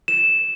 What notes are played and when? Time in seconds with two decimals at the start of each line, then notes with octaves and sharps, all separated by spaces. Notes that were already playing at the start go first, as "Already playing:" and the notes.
0.08 E7